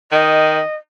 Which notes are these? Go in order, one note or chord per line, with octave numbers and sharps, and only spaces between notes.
D#3 D#5